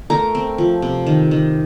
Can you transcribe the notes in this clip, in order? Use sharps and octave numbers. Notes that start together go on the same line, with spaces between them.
A3 A#4 A#5
C4
F3
C3
D#3
D#3